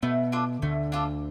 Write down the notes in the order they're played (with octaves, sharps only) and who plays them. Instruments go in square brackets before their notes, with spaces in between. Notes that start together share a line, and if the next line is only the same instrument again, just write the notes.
[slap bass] B2 B3 [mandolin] A3
[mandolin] D4 F4 A4
[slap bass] D2 D3 [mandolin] A3
[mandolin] D4 F4 A4